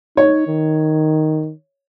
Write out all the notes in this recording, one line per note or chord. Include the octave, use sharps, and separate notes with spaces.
D#4 C#5
D#3